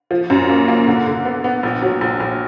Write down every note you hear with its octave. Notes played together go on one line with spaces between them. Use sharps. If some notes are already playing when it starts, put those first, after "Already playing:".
F3
F#2
A#3
A#3
D3
D3
B3
B3
A#1
F#3
A#1
A#1